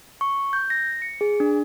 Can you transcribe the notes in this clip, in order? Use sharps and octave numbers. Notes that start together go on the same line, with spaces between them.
C#6
G6
A#6
C#7
G#4
D4